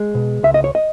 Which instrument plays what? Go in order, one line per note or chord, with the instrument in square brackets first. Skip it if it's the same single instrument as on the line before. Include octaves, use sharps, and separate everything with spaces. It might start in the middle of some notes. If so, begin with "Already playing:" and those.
Already playing: [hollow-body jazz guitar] G#3
B2
C#2 E5
D#5
C#5
D#5